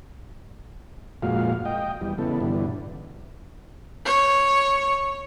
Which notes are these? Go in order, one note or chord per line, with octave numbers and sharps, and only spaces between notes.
F2 A#2 G#3 F#4 F5
D#5 G5
E2 G3
C#3 E3 B3 A4
G2 B2 D3 E3
C#5